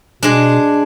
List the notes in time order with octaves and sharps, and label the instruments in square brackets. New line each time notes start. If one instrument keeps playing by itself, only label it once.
[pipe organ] B2 [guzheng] G#3 D4